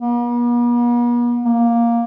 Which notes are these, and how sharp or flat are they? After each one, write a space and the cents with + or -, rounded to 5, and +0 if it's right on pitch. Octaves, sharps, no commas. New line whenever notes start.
B3 -45
A#3 +5